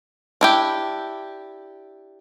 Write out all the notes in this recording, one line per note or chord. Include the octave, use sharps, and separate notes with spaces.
D4 E4 G4